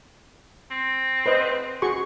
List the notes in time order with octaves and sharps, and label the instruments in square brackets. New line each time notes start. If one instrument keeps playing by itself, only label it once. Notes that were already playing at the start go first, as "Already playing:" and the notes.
[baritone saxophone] C4
[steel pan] B4 C5 D#5
F#4 G#4 C#6